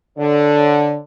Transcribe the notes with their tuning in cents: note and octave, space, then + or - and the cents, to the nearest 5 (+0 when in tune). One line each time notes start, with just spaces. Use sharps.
D3 +0 C#5 +0